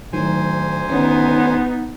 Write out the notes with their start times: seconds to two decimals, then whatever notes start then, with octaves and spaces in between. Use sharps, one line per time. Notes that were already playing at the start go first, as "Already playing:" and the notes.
0.13 D2 A2 D#3 F#3 C5 G#5
0.90 D#3 B3 C#4 D#4